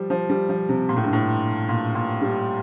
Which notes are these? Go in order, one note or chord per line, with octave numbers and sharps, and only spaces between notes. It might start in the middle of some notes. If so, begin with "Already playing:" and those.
Already playing: F3 G3
F3
G3
F3
C3
A#2
A2
G2
A2
A#2
A#2
G3